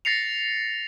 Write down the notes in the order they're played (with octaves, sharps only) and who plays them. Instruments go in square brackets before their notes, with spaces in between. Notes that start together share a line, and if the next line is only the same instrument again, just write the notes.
[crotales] A6 A#6 C7 C#7 F7